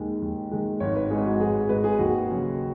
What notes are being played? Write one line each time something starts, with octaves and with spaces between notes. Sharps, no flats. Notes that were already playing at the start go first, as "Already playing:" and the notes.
Already playing: D#2 D#3 G#3
D#2
D#3 G#3
G#1 C#5
B4
G#2 G#3 G#4
F#4
G#1 G#4
G#2 G#3 B4
G#4
D#2 F#4
C#3 F#3